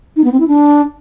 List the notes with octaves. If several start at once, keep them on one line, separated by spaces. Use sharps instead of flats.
D#4
B3
C4
E4
D4